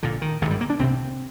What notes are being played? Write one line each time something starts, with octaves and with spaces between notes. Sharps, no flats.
A#1 A#2 D3
D#3
G#1 G2 D3
G3
A#3
D4
C2 C3 C4